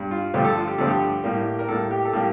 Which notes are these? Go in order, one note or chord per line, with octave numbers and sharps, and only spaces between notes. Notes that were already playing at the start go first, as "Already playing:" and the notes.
Already playing: G2
F4
G2 D3 F3 A3 G4
A4
F4
G4
G2 D3 F3 A3 A4
G4
A2 G3 A#3
A#4
A2 G3 A#3 A4
G4
A4
A2 G3 A#3 G4